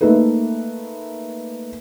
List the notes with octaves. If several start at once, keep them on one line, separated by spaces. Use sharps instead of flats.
A3 A#3 D#4 A4 B4